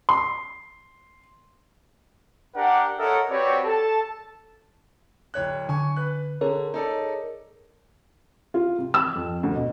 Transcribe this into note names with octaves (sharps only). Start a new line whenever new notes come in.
C6
D4 G4 A#4 F#5
A4 A#4 C#5 D#5 E5 F#5
C4 F#4 G4 B4 C#5 D5
A4 A5
D1 C#5 F#6
D3 G#5 C#6
B4 F#6
D3 G#4 A#4 C#5
D#4 A4 D5
F4
C3
E6
F2
D2
B2